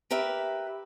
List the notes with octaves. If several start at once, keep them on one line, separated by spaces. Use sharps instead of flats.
G4 A#4 B4 E5